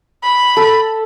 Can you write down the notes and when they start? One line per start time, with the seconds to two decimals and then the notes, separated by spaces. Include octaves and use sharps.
0.23 B5
0.57 A4